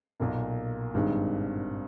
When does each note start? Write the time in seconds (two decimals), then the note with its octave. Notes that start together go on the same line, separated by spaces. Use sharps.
0.20 B1 A#2 A#3
0.94 G#1 G2 D#3 G#3